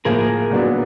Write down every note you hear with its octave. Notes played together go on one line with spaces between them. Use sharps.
A2 F3 A#3 G#4 A#4
A#2 F#3 B3 D4